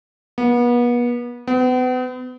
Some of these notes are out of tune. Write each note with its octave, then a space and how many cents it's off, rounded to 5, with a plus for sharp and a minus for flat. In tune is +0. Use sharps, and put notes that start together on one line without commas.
B3 -35
B3 +40